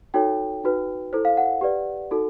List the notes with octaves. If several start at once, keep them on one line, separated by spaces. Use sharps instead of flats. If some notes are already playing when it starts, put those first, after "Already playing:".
D#4 F#4 A4 C#5 G5
D#4 F#4 B4
E4 A4 C5
F5
F#5
G4 B4 D5
D#4 F#4 A4